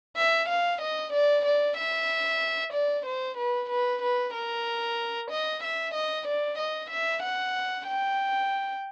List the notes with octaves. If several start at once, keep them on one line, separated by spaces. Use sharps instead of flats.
E5
F5
D#5
D5
D5
E5
D5
C5
B4
B4
B4
A#4
D#5
E5
D#5
D5
D#5
E5
F#5
G5